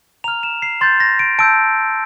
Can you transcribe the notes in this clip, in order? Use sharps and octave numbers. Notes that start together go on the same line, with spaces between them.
A#5 F6 F7
E7
C7
C6 G6 A6
A#6
D7
A5 E6 G6 D7